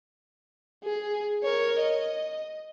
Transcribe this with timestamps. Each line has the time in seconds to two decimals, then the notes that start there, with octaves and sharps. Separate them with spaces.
0.84 G#4
1.44 A#4 C#5
1.79 D#5